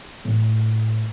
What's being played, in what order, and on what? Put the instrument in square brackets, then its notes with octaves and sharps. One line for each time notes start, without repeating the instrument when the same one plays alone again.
[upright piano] A2